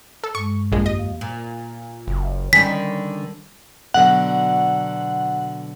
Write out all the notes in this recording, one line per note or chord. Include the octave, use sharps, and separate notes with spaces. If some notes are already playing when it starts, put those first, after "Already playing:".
A4
G2 G#3 C#6
A#1 F2 D#3 G#3 A#3
G4 D#5
F5
A#2
F#1
D3 D#3 G3 C#4 B6
B2 D3 F#3 F#5